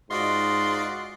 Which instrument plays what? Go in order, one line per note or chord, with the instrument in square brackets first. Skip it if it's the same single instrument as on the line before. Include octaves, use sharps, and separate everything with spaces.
[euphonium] G#2 [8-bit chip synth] F4 F#4 D5 [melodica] D#5 [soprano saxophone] C6